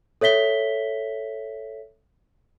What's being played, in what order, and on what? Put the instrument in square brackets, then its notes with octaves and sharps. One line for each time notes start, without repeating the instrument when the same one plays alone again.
[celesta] A4 C#5 E5 B6 G7